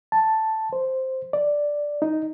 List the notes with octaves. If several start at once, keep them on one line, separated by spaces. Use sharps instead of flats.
A5
C5
D5
D#4